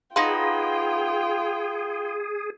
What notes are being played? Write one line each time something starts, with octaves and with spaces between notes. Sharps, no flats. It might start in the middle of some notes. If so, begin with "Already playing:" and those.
D#4 F4 F#4 G#4 B4 F5 G5 C6